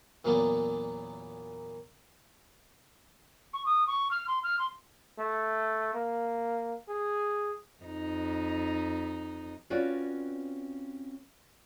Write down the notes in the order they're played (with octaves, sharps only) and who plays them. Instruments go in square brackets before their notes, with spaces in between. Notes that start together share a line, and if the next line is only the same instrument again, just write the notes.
[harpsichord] E2 A#2 F#3 A#3 B3 D4
[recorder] C#6
D#6
C#6
F6
C6
F6
C6
[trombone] A3
A#3
G#4
[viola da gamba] F2 D#4
[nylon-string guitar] C4 C#4 F4 F#4 B4 D5